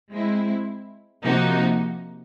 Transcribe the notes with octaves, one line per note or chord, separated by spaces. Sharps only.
G#3 C4 E4
C3 F3 A#3 D#4 F#4